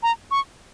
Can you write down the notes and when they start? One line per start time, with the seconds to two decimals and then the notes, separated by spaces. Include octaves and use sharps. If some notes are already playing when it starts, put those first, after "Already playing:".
0.03 A#5
0.31 C#6